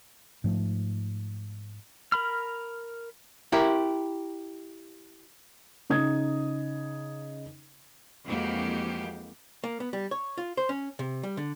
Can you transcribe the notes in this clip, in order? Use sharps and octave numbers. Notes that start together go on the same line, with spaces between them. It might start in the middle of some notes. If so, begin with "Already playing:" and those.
G#2 F3 A3
A#4 B5 F6
E4 G4 A#4
C#3 D#4 D#6 G#6
F2 E3 G#3 A#3 F#4 G4
A#3
B3
G3
C#5
F4
C5
C#4
C3
G3
D3